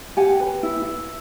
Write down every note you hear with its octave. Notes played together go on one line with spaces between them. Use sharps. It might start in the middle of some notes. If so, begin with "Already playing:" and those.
G4 F#5 G#5
B4
E4
E4